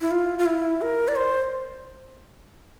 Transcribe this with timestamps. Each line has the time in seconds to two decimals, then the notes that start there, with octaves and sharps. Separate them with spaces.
0.01 E4
0.11 F4
0.39 F4
0.46 E4
0.82 A#4
1.08 D5
1.16 C5